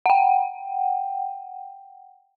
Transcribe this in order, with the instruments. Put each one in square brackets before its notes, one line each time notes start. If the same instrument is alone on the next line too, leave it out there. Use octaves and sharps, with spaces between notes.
[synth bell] F#5 G5